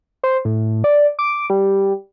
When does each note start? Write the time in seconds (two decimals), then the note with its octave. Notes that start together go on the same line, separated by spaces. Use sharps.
0.24 C5
0.45 A2
0.84 D5
1.19 D6
1.50 G3